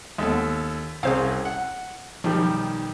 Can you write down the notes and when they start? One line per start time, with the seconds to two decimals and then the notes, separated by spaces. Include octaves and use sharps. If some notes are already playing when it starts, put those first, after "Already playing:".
0.18 D#2 G#3 B3 A4
1.03 C2 C4 C#4 G#4 C5 F5
1.45 F#5
2.24 B1 D#3 F3 G3